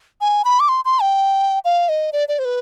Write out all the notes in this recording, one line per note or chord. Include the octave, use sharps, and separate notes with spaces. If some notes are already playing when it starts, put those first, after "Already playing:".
G#5
B5
D6
C6
C6
G5
F5
D#5
D5
D5
C5
B4